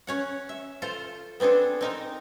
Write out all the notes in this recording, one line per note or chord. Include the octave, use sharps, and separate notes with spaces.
C#4 C#5 F#5
E5
F4 A4 C5
B3 C4 D4 G#4 A4
C4 D#4 A#4